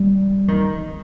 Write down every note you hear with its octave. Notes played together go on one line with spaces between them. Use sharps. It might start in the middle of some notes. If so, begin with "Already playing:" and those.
Already playing: G3
D#3